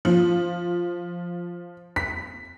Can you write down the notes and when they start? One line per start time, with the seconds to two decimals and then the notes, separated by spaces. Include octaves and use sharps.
0.05 F3
1.96 B6